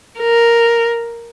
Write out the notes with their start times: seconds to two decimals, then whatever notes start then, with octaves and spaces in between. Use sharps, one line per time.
0.19 A#4